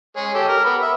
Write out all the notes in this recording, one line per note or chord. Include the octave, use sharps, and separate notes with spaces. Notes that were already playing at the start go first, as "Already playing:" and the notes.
G#3 G#4 C#5
G4 A4
A#4
B3 B5
E5